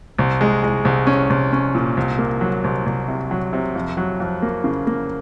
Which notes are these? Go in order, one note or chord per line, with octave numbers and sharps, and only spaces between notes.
C2
G#3
G#3
C2
C#4
C2
C#4
A#2
C2
A#3
F#3
C2
C2
C3
F#3
C3
F2
F#3
F2
A#3
C#3
A#3